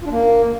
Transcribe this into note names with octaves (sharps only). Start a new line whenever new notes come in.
F4
D4
A#3